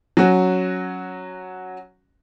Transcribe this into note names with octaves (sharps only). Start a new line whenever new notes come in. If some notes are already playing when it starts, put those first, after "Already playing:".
F#3 C#4 F#4